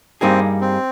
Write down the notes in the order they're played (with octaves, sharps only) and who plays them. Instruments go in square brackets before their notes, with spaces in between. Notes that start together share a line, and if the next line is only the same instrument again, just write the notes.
[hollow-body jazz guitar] G2 G3 A#3 D#4 G#4 [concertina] C4
[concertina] C4